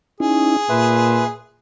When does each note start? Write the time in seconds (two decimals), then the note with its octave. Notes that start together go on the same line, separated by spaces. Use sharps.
0.20 C#4 D#4 E4 G#4
0.69 A#2 B4 E5 C6